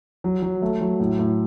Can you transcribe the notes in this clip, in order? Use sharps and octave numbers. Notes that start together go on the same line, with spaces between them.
F#3
F#3
A3
F#3
A2
A2